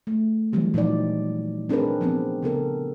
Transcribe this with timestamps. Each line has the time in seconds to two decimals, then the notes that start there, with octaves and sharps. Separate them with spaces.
0.07 A3
0.52 E3 F#3 G3 C4
0.74 A#2 F3 D#4 D5
1.69 C4 D4 G#4 A#4 B4
2.01 F3 B3 C4
2.43 C#3 B3 A4 A#4